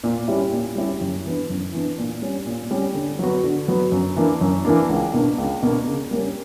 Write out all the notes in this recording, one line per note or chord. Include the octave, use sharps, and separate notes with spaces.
A#2
G3 C#4 E4 G4
A#2
G3 C#4 E4 G4
F#2
E3 B3 D4
F#2
E3 B3 D4
A#2
G3 C#4
A#2
G3 C#4
D3
F#3 B3 F#4
D3
F#3 B3 F#4
F#2
E3 A#3 D4
F#2
E3 A#3 D4
C#2
B2 A#3 D4
C#2
B2 A#3 D4
C#3
G3 A#3 C#4